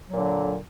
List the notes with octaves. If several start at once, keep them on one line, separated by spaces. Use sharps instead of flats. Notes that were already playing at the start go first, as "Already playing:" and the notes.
A#2 D3 F#3